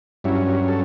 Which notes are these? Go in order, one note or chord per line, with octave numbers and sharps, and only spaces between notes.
G2 F#3 C#4 E4
A4